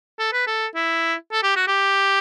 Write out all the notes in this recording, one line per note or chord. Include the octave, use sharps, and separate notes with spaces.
A4
B4
A4
E4
A4
G4
F#4
G4